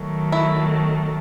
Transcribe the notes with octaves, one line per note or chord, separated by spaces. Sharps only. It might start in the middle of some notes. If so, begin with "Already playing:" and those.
Already playing: D#3 F#3 A3
E4